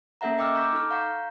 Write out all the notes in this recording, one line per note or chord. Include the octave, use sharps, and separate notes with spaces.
A#3 C#4 A4 E5 F#5 A#5
D#5 G5 D6 E6 F6
A#5 C#6 D6 G6 B6
D#4 A4 F6
F5 F#5 A#5 C#6 G6